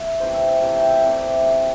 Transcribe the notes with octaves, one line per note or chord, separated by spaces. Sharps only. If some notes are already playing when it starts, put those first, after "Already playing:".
Already playing: E5
C3 E3 A3 C5
E5
E5
C3 E3 A3
G5
E5
C3 E3 A3 D5
C3 A3